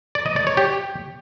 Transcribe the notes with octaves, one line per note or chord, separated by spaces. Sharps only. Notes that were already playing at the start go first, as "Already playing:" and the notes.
D5
D#5
D5
C#5
G4